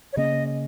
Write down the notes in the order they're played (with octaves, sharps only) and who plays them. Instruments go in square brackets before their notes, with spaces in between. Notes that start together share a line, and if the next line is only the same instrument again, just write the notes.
[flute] C#5
[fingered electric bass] C#3 A#3 C#4 [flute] D#5